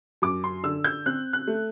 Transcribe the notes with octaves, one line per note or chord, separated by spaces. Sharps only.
F#2 D6
C6
D3 E6
G6
C4 F#6
F#6
A3